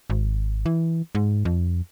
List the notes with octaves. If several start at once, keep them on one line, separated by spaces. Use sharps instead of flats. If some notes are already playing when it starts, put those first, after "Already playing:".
G#1
E3
G#2
F2